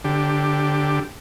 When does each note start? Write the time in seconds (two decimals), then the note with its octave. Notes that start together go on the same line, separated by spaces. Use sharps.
0.04 D3 G4